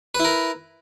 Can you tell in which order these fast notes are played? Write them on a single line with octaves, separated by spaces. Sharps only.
B4 E4 A#4